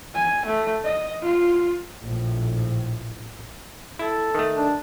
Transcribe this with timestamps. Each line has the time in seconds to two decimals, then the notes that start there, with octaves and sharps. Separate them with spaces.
0.14 G#5
0.45 A3
0.84 D#5
1.21 F4
2.02 A#1 A2
3.99 E4 A4
4.35 D#3 A3
4.56 D4